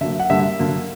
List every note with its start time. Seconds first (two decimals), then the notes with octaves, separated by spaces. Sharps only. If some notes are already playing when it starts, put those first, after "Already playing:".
0.01 D3 F#3 A#3 E5
0.20 F#5
0.30 D3 G3 A#3 E5
0.59 D3 F#3 A#3